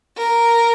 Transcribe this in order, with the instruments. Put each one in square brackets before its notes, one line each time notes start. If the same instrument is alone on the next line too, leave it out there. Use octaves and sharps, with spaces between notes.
[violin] A#4